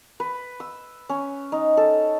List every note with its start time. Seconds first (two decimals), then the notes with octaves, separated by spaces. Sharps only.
0.20 B4
0.60 E6
1.09 C#4
1.52 D#4
1.77 A4